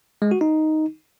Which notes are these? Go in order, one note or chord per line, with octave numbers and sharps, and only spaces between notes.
G#3
F#4
D#4